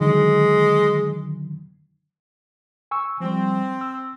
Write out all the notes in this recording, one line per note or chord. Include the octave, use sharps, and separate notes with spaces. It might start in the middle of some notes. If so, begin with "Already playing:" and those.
D3 D#3 F#3 G#3
G#5 C#6 E6
F3 G3 C4
E6